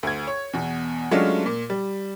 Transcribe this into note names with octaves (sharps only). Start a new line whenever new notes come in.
D2 G#6
C#5
E2 B2
F#3 G#3 A3 C#4 D4 F4
A#2
G3